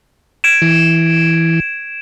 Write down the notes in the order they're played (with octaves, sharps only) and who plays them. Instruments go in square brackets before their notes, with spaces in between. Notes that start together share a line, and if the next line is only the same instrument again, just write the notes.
[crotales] G#6 D7 E7
[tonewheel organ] E3